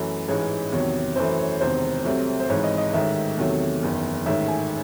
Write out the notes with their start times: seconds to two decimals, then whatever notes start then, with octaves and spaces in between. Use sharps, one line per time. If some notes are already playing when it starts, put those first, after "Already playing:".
Already playing: F#2 E3 A3
0.28 A1 G#2 E3 G#3 C#5
0.72 E2 C3 D#3 F#3 C#5
1.16 F#2 E3 A3 C5
1.39 C#5
1.61 E1 E2 C3 D#3 C5
2.05 C2 C3 F#3 A3
2.40 C5
2.49 G#1 G#2 E3 C#5
2.64 D#5
2.78 D#5
2.93 A1 G#2 D#3 A3 E5
3.37 E2 C3 D#3 F#3 A3
3.82 F#1 E2 D#3
4.26 A1 G#2 D#3 A3 E5
4.48 G#5